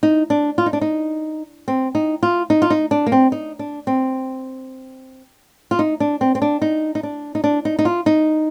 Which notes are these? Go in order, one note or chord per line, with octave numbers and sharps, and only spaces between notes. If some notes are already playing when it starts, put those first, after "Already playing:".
D#4
D4
F4
D#4
D4
D#4
C4
D#4
F4
D#4
F4
D#4
D4
A#3
C4
D#4
D4
C4
F4
D#4
D4
C4
C4
D4
D#4
D#4
D4
D#4
D4
D#4
D#4
F4
D#4